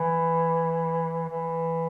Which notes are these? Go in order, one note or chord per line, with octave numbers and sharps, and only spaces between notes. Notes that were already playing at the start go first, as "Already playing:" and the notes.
Already playing: E3
E3